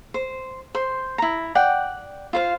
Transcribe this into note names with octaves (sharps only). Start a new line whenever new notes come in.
C5
C5 C6
E4 A#5
D5 F#5 G5
F4 C5 F5